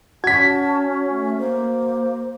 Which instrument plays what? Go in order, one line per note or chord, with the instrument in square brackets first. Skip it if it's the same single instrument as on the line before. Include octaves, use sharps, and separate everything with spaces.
[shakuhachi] C#4 [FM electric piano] F#4 [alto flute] A5 [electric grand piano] G#6 B6
[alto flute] A3
[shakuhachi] A#3 [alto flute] C5